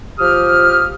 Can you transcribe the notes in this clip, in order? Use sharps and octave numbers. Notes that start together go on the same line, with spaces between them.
F3 G4 D#6 F6